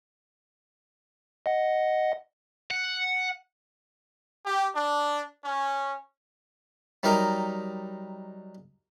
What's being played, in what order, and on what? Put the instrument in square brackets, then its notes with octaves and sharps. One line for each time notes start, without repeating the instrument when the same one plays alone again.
[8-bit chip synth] D#5 F#5
[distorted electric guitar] F#5
[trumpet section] G4
D4
C#4
[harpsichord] F#3 G3 D#4 G4 A#4 D#5